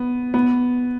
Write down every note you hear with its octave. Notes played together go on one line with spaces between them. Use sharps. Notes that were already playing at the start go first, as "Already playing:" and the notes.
Already playing: B3
B3